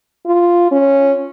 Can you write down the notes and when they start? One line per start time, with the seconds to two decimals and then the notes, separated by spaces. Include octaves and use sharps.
0.26 F4
0.72 C#4